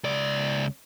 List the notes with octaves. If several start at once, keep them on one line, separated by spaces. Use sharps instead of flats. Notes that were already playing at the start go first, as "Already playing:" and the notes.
C#2 D5